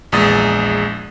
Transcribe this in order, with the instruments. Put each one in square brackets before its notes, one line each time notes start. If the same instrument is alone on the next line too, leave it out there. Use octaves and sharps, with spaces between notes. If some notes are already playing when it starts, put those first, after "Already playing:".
[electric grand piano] A#1 E2 G#3 D#6 A6